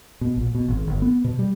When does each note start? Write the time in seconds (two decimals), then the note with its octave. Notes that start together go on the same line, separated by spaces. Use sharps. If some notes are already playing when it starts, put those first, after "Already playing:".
0.21 B2
0.36 A#1
0.55 B2
0.68 G#1
0.87 G1
1.02 B3
1.24 B2
1.39 G3